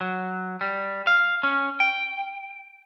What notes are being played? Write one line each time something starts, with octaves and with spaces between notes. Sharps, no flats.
F#3
G3
F5
C#4
G5